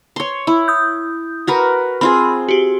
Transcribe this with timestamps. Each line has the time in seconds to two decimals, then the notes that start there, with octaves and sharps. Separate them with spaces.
0.16 C#5 C6
0.47 E4
0.68 D#6 G6
1.47 F#4 A#4 B4
2.01 C4 F4 G#4 B5
2.49 F#4 G4